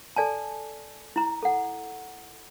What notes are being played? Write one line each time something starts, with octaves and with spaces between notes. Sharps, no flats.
A4 D5 G#5 A5
E4 A#5
A4 F#5